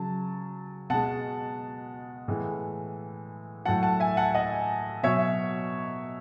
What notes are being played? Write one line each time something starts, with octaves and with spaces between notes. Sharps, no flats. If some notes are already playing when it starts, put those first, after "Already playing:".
Already playing: C#3 F#3 A5
B2 G#3 F#5 A5
A2 E3 G#3
A2 F#3 F#5 A5
F#5 A5
E5 G#5
F#5 A5
D#5 F#5
B2 F#3 C#5 E5